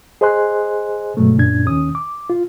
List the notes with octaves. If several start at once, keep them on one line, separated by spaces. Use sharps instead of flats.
G#4 C5 D#5 G#5 C6 F#6
G2 B2 F#3 G#3 A3
F#2 A#2 C#3 D4 G#6
D#2 D#3 C#4 D#6
D6
F4